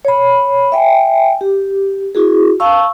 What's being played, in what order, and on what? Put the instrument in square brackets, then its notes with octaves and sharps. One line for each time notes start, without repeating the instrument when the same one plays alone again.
[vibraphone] C#5 B5
E5 G5 G#5
G4
E4 F#4 G#4
F5 A5 C#6 E6